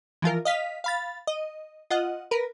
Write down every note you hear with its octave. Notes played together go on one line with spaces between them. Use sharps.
E3 F3 F4 A#4
D#5 F5 B6
F5 B5 A6
D#5
F4 D#5 F#5
A#4 B4